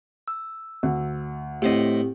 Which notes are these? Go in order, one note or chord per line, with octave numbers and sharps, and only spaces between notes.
E6
D2
A2 C4 G4 C5 D#5